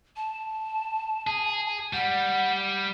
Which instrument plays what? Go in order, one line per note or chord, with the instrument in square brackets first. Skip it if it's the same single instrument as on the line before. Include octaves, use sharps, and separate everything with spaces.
[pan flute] A5
[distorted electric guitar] G#4
[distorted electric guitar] G3 [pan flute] F#5